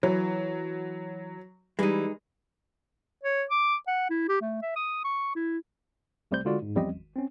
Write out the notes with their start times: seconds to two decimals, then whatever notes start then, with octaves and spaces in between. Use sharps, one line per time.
0.03 E3 F#3
1.79 E3 G3 G#3 D#4
3.23 C#5
3.50 D6
3.87 F#5
4.10 E4
4.29 G4
4.41 A3
4.62 E5
4.76 D#6
5.04 C#6
5.35 E4
6.31 C2 C3 G3 A3 C5 G6
6.45 D3 G#3 F4 F#4 D5
6.62 G#2
6.75 E2 F3 G3 C4 C#4 D#5
6.94 G#1
7.16 C4 C#4